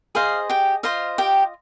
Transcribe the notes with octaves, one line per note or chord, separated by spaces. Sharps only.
G#4 C5 D#5 F5
G4 G5
F4 C5 D#5 F5
G4 G5